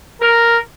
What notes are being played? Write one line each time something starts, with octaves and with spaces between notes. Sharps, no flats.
A#4